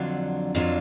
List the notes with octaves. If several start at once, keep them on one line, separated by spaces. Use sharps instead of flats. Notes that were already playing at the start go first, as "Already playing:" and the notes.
Already playing: F2 D3 F#3 D4 F4
F2 D3 F#3 D4 F4